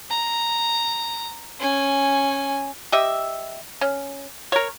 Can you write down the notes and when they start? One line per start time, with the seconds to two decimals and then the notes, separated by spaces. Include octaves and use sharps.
0.10 A#5
1.60 C#4 G#5
2.92 G4 D#5 E5
3.81 C#4
4.52 A#4 C#5